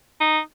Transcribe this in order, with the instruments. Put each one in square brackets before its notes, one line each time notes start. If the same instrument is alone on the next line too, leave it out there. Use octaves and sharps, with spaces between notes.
[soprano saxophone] D#4